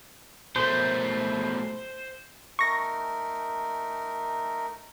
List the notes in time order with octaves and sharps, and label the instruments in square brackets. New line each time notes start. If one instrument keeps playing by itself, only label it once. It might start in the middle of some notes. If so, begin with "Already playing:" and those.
[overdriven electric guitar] B2 A3 [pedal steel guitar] C5
[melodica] A3 D#4 A#4 [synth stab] C#6 A#6